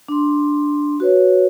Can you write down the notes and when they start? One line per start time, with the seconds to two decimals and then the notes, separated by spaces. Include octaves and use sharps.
0.09 D4 C6
1.00 F#4 B4 C#5